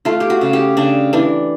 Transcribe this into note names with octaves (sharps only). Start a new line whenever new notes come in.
A3 F4
G4
F#4
C#3
G4
C#3 D4
E3 D4